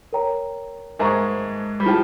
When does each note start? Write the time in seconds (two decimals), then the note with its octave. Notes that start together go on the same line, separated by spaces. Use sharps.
0.13 A#4 C#5 G5 A#5
0.99 G#2 G#3 A#4 E5 A#5 C#6
1.80 G3
1.86 F3 E4 G#4 C5 G5